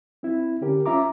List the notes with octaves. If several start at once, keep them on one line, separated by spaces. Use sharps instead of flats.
C4 E4
D3 C#4 G4 A#4
C#4 F4 E5 A#5 D6